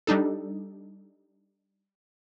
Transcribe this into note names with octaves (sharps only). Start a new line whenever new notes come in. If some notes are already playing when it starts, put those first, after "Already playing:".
G3 D4 D#4 A4